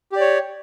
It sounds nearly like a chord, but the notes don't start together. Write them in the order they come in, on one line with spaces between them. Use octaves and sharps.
G4 D5 C#5